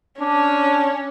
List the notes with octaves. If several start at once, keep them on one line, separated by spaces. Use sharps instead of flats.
C#4 D4